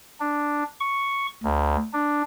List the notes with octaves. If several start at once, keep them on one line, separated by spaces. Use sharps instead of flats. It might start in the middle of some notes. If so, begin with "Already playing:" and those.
D4
C#6
D2
D4